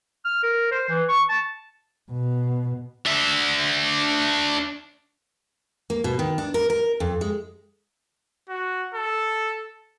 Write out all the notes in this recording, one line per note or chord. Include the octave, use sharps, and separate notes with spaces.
F6
A#4
C5
E3
C#6
A5
B2
D4 E5
A#3
B2
D#3
D4
A#4
A#4
F2
G#3
F#4
A4